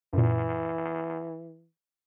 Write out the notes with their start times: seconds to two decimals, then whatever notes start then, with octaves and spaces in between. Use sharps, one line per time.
0.13 F#2 A#2 E3